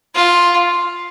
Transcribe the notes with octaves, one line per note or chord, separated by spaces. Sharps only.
F4